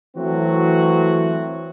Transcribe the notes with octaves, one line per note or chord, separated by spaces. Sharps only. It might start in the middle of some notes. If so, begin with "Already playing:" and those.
E3 F#3 A3 C4 F#4